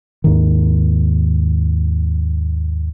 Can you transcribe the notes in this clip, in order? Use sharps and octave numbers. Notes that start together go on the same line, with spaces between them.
D#2 G#2 D#3